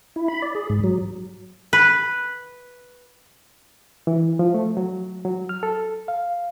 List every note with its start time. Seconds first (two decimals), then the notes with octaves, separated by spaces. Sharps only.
0.16 E4
0.28 B5
0.42 D5
0.55 G#4
0.70 G#2
0.84 F#3
1.73 B4
4.07 E3
4.39 F3
4.54 A3
4.77 F#3
5.25 F#3
5.49 F6
5.63 A4
6.08 F5